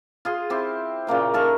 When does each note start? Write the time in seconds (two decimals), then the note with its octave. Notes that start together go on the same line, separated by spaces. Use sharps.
0.25 F4 G#4 C6
0.50 C4 E4 G4
1.07 A#2 C#3 A#3 G5
1.34 D#4 A4 A#4 C#6